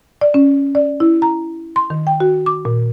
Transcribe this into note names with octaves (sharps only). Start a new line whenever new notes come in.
D5
C#4
D5
E4
A#5
C6
D#3
G5
F#4
D6
A#2